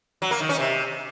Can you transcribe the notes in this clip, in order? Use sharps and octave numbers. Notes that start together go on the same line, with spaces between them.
F#3
A#3
D#3
C#4
C3